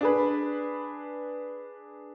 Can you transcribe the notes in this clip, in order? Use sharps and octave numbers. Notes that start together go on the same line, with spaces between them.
D4 G#4 B4